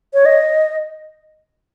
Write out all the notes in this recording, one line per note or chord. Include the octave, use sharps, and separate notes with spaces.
C#5
D#5